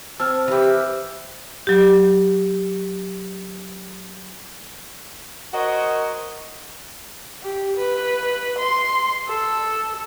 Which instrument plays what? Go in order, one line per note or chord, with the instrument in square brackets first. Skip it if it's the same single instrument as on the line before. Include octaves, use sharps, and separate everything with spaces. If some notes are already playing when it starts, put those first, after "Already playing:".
[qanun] C4 C#5 [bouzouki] A5 [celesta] E6 F6
[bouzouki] E3 B4 [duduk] G4
[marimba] F#3 G4
[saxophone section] F#4 A#4 C5 C#5 D#5 F#5
[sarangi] G4
B4
C6
A4